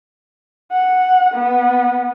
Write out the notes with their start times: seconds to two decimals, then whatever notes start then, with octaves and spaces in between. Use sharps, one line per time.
0.73 F#5
1.35 B3